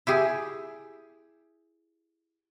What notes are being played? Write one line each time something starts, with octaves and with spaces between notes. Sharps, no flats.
E4 G4 G#4